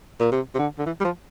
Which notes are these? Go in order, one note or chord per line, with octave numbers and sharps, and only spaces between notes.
A#2
C3
C3
D3
D3
E3
G3
F3